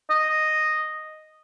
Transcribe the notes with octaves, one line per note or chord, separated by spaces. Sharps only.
D#5